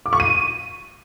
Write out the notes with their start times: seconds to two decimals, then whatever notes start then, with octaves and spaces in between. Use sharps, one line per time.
0.06 D6
0.13 C#6
0.20 D#7